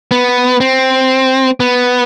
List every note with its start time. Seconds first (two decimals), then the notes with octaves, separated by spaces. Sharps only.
0.11 B3
0.60 C4
1.60 B3